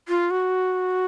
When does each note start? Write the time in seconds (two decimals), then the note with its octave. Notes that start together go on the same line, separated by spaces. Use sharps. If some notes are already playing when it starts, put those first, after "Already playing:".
0.09 F4
0.31 F#4